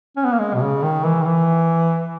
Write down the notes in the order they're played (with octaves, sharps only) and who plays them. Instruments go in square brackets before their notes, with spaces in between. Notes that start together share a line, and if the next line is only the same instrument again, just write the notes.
[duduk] C#4
B3
A#3
G#3
B2
C#3
D#3
E3
D#3
E3